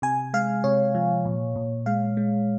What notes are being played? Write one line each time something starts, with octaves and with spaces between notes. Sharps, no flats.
C3 G#5
G#3 F5
C3 C#5
F3
A#2
A#2
G#3 F5
G#3